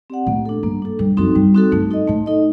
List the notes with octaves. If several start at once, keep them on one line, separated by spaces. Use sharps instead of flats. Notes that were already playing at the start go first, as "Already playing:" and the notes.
C4 G4 D5 F#5
A2 A#3
D4 A4
G2 A#3
D4 A4
G2 G3
F#2 C4 D#4 F#4 A4
G2 G3
C4 D#4 F#4 A4
G2 A3
D#4 A4 D#5
A2 A3
D#4 A4 D#5